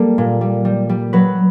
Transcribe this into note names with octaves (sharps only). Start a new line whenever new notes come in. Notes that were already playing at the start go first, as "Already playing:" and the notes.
Already playing: G3 A#3 A4
A#2
G3
G3
G3
F#3 B4